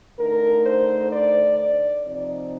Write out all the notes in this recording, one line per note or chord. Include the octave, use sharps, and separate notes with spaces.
D3 A3 D#4 A#4
C5
D5
D5
C3 F3 C4 D#4 D5